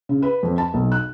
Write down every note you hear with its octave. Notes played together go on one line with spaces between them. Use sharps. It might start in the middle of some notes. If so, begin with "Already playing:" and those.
C#3
B4
F2
A5
B1
F#6